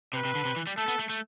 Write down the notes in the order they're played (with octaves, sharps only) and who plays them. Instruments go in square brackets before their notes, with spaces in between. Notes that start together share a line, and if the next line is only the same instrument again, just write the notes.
[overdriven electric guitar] C3 [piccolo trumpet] B4
[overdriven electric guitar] C3
D3
C3
E3
G3
[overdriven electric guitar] A3 [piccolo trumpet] A4
[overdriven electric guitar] B3
A3
A3